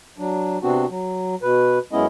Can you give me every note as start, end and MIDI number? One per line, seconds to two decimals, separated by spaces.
0.18 0.58 54
0.18 0.58 62
0.63 0.86 48
0.63 0.86 59
0.63 0.86 60
0.63 0.86 62
0.63 0.86 66
0.90 1.35 54
1.42 1.79 47
1.42 1.79 71
1.92 2.06 42
1.92 2.06 56
1.92 2.06 59
1.92 2.06 61
1.92 2.06 64
1.92 2.06 75